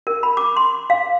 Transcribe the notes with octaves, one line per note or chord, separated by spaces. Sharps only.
A#4
B5
D6
C6
F5